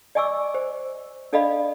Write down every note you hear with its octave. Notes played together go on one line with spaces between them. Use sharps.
D5 D#5 G#5 C#6 D6 E6
C5
D4 A4 D5 D#5 F5 B5